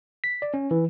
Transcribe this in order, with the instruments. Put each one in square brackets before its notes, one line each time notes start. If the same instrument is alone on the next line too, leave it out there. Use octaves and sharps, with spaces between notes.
[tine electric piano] B6
D5
C#4
E3